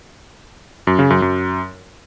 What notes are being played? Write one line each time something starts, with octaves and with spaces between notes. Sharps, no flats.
F#2
C#3
F#2
F#2